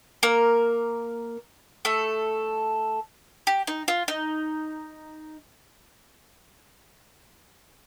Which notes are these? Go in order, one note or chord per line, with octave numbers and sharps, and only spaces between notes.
A#3 A#4
A3 A4
G4
D#4
F4
D#4